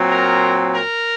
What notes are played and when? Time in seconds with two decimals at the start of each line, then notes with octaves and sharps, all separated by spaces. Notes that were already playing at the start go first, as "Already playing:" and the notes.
Already playing: A#2 F#3 C4
0.11 A#4
0.74 A#4